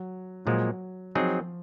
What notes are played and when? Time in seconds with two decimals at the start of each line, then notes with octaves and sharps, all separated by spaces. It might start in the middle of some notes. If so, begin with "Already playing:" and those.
Already playing: F#3
0.45 A#2 F3 F#3 G#3
1.15 F3 F#3 C4 D#4 G#4